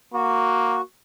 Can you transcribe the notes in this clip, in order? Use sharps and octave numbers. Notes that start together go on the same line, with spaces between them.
A#3 F#4